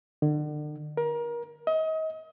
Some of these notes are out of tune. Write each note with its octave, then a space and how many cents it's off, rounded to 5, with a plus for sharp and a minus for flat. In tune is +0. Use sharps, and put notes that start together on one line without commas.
D3 +40
A#4 +30
D#5 +30